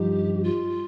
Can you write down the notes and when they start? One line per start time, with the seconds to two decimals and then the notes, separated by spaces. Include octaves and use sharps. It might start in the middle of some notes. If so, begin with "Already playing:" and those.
Already playing: G2 F3 D#4 G4
0.43 F4